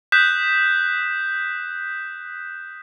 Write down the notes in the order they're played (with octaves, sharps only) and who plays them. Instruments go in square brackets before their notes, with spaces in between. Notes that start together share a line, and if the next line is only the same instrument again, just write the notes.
[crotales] D#6 F#6 G6 B6 E7